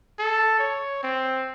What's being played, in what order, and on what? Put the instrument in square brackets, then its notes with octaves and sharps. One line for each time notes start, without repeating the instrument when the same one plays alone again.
[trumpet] A4
C#5
C4